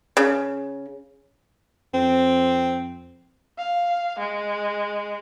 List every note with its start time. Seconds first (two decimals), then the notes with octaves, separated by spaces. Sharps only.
0.17 C#3
1.94 F2 C4
3.58 F5
4.19 G#3